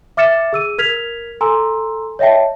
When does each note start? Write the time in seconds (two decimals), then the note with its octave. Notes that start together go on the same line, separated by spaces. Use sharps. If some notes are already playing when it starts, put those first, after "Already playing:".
0.17 E5 D6 F6 A6 C#7 E7
0.53 G#4 E6 D#7
0.78 A#4 F6 G#6 B6 F7
1.41 A4 G#5 A#5 C6 E6
2.19 C#5 D#5 E5 G5 A5